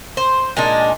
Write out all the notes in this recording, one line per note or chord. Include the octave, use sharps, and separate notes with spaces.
C5
A#2 G#3 D4 D#4